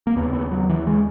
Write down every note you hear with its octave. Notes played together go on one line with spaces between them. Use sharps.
A#3
D#2 C#3 B3
B3
F#3
E3
G#3